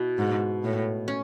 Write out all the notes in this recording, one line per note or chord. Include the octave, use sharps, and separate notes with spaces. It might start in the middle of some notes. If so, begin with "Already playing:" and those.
Already playing: B2 E4
G#2
A2
C#4